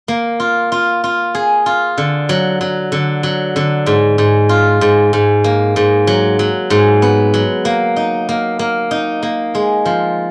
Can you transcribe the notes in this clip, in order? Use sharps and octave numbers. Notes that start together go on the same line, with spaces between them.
A#3
F4
F4
F4
G#4
F4
D3
F#3
F#3
D3
F#3
D3
G#2
G#2
F4
G#2
G#2
A#3
G#2
F#3
F#3
G#2
B3
F#3
A#3
D#4
A#3
A#3
D#4
A#3
G#3
F3